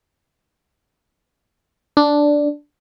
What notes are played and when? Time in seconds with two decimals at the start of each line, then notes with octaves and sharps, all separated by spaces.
1.97 D4